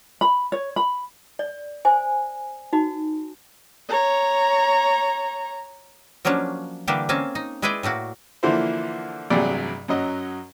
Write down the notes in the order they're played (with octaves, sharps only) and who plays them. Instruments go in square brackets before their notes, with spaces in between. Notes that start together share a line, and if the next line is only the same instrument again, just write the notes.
[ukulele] B5
C#5
B5
[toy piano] D5
C5 G#5
D#4 F#4
[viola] C#5 A#5
[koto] F3 F#3 A#3 C#4 D4
D3 E3 G3 A#3 D4 G4
A#3 C4 C#4 G#5 A5
D#4
G#3 E4 G#4 B4 D5 G5
A2 A3 A#3 F#4
[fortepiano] D3 E3 F3 A#3 E4 C5
A1 G2 C3 F#3 G#4 D5
F#2 F#3 C#4 D#5